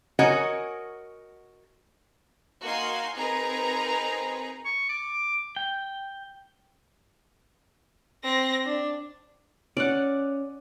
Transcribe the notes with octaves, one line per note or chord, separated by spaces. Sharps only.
F#4 A#4 C#5 D#5 F#5 G#5
A#3 D#4 F#4 F5 G#5 C6
C4 D#4 G#4 A#4 B4 A#5
C#6
D6
G5
C4 A#6
D4
C#4 D5 F#5